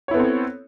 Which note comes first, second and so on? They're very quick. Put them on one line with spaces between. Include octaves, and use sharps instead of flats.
C#5 E4 B3 A4 C4